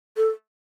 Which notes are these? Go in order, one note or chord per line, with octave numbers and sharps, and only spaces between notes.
A4